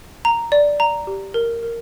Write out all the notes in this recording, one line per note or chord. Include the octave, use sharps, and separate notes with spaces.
A#5
D5
A#5
G4
A#4
A#4